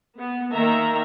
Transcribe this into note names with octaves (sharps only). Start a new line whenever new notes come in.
B3
D#3 A#3 E5 A#5